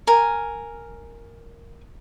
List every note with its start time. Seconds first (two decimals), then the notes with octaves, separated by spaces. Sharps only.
0.07 A#4 G#5